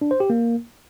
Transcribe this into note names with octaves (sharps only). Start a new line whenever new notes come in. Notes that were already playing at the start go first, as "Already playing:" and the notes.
D4
C5
G4
A#3